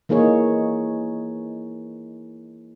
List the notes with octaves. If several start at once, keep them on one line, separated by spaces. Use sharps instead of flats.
E3 A#3 D#4 G#4 C#5